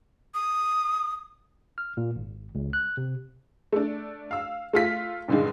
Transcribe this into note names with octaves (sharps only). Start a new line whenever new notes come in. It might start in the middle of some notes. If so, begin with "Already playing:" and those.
D#6
F6
A#2
G#1
C#2
F#6
C3
A3 D4
F5 E6
A3 F4 B6
G2 A#2 D3 D#3 G#3